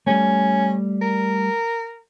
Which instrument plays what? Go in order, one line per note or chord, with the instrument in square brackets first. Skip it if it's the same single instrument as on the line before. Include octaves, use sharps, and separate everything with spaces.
[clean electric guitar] G3 A3 [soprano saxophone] C#4
[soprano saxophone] A#4